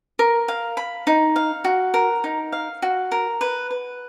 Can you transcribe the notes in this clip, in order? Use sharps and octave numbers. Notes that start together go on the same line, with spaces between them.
A#4
F5
B5
D#4
F5
F#4
A#4
D#4
F5
F#4
A#4
B4
B4